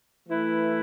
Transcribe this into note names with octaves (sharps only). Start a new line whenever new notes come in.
E3 A3 E4 B4